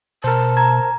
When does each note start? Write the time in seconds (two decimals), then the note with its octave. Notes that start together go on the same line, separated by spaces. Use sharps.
0.24 B2 A#4 C5 A5
0.57 A#5 G#6